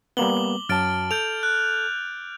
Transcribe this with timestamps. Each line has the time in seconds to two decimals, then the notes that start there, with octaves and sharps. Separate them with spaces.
0.17 G3 A#3 B3 D6 F#7 G7
0.69 F#2 F#3 A5 F6 A6 D7
1.11 A4 G6 D7 F7
1.43 F#6